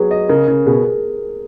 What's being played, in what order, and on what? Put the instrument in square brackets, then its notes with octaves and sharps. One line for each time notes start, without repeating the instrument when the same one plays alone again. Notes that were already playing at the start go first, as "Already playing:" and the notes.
Already playing: [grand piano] F#3 [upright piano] G#4 B4
[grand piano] D#5
[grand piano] C#3 [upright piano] A#4
[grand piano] C#3
[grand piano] B2 [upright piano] G#4